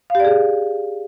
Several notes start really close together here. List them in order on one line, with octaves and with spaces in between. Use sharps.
F5 G4 D5 G#4